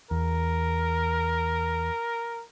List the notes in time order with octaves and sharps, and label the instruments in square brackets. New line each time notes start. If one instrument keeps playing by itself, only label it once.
[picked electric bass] E2 [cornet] A#4